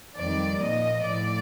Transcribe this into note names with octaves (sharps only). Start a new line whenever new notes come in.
F2 D#3 G3 D5
A#2 F3 D#5
A2 F3 D5